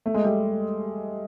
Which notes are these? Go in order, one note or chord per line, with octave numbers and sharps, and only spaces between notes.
A3
G#3
G3 A3